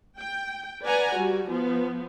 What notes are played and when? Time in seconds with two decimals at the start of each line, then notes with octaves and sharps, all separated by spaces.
0.20 G5
0.83 B4 D5 F#5 G#5 A#5
1.15 G3 F#4
1.49 F3 B3